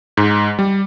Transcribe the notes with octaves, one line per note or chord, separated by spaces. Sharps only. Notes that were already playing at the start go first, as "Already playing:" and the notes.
G#2
G3